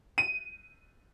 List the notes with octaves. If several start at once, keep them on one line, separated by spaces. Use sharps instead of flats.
D#7